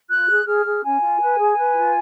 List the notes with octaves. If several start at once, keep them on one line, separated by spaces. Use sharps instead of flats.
F4 F#6
G#4
G#4 F6
G#4
C#4 G#5
F4
B4
G#4
B4
F4